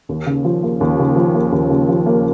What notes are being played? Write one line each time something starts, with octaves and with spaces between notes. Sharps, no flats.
D#2
C#3
F3
A#3
D#2
C#3
F3
A#3
D#2
C#3
F3
A#3